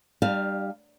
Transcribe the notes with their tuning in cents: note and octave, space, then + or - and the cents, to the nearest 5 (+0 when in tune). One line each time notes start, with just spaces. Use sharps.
G3 +0 D4 +40 F5 +5